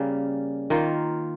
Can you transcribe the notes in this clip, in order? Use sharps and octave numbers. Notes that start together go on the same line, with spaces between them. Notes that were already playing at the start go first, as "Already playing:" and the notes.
Already playing: C#3 G3 A#3
D#3 A#3 F4